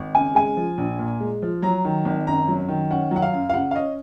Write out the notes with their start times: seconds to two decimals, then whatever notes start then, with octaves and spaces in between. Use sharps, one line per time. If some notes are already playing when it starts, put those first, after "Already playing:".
Already playing: G#1
0.14 C#3 G#5
0.35 G#3 G#5
0.57 F3
0.78 A#1
0.99 A#2
1.20 G#3
1.42 F3
1.62 F#3 A#5
1.85 D#3
2.05 G#1
2.27 F#2 A#5
2.48 F#3
2.69 D#3
2.91 C#4 F#5
3.11 F#3
3.16 F#5
3.22 F5
3.33 F#2
3.50 F5
3.54 C#3 F#5
3.71 F5
3.75 C#4 D#5